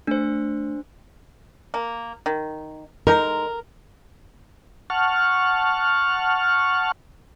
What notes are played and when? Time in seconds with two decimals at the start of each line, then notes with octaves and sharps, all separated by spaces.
0.07 A3 D4 C5
1.74 A#3
2.26 D#3
3.07 G#3 D#4 A#4 A#5
4.90 F#5 A5 C#6 F6